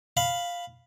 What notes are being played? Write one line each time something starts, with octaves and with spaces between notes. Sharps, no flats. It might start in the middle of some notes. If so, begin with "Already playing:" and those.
F5 B5